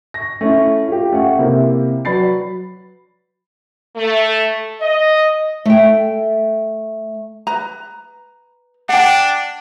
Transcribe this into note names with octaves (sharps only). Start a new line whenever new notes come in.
C#6 A#6
A3 C#4 E4
F4 G4
A3 C#4 F#5
C3 A#3 C4 E4
F#3 B4 D5 B5 A6 C7
A3
D#5
A3 G5
B4 A#5
D4 F#5 G5